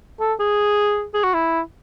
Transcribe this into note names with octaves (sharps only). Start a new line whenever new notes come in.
A4
G#4
G#4
F#4
E4